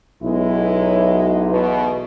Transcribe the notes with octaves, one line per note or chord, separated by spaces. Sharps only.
B1 F#3 G#3 E4
E2 B2